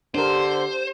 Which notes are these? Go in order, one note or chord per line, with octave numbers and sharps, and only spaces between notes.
D3 D4 G4 A#4 C5